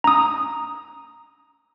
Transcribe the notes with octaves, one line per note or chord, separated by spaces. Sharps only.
A#5 D#6